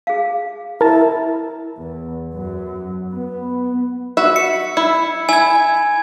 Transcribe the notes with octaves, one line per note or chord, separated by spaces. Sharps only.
G#4 F5
E4 A#4 A5
E2
F#2
B3
F#4 E5
C#7
E4
E4 G#5 G#6